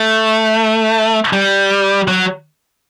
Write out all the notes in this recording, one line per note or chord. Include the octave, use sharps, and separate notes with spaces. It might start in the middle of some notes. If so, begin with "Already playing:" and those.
Already playing: A3
G3
F#3